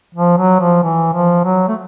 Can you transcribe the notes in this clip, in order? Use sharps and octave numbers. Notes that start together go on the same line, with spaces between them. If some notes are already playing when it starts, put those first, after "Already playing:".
F3
F#3
F3
E3
F3
F#3
A3